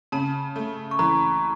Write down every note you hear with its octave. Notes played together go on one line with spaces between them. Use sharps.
C#3 A5
A3
C#6
E3 A#5